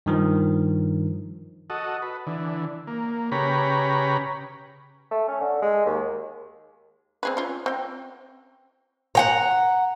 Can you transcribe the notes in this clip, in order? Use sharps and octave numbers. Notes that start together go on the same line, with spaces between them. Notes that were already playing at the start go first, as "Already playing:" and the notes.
G2 D#3 F3
F#4 A4 D#5
B4
D3 E3
A#3
C#3 G4 B4 C#5 A#5 B5
A3
C#4
D3
G#3
D#2
C4 G#4 B4
C#4 F4
C4 G5
F#5 G5 A#5